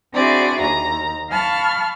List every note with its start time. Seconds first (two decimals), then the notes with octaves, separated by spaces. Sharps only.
0.14 C4 D4 E4 F#4 G#4 D5
0.62 D#2 A#5
1.29 F5 A5 B5 C#6 F6